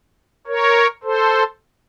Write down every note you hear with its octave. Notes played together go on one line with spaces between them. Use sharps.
A#4 C#5
A4 C5